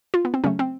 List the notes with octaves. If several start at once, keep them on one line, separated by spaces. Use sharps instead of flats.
F4
B3
C4
C#3 F#3 A3 C#4
C4